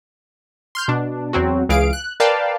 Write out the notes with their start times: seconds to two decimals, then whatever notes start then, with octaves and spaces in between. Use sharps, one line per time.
0.75 C6 F6 G6
0.88 B2 D4
1.33 E2 F#3 C4 F#4
1.69 C#2 E3 G#4 F5 D7
1.93 F#6
2.20 A#4 B4 D5 F5 G5 A5